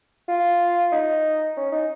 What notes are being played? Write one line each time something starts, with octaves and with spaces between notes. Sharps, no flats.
F4
D#4
C#4
D#4